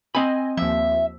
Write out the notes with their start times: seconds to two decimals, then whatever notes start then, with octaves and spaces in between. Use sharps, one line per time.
0.15 C4 D#5 G#5 B5
0.57 D#2 F3 E5